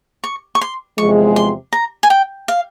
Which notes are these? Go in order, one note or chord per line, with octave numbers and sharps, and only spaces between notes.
C#6
C#6
C6
E2 C3 F3 G#3 C#6
C6
A#5
G#5
G5
F5